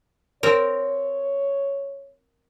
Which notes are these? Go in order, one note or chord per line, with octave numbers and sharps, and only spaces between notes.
C4 A#4 C#5